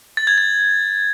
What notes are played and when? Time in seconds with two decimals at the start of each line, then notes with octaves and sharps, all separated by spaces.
0.17 A6
0.27 G#6
0.38 A6